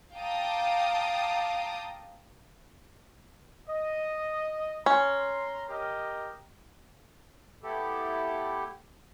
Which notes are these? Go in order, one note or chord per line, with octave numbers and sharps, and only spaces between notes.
F5 G5 A5 A#5 D6 D#6
D#5
C#4 A#5 C6
G4 A#4 D#5
A3 B3 E4 G4 A4